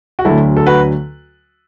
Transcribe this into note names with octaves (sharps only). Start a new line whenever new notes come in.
F#4
D2 D3 F#3 E4 A4
A4
F#4 B4